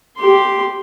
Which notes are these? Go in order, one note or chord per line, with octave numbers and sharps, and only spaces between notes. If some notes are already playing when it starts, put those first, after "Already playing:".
G4 C6